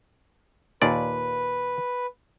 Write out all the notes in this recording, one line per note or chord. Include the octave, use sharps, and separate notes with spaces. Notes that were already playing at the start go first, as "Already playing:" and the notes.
D#2 A#2 B4 D5